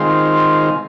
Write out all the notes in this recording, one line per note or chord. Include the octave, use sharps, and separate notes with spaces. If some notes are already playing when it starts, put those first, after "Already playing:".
Already playing: D#3 G#3 C4 F4